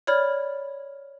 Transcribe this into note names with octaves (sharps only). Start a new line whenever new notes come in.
C#5 D5 B5 F6 G#6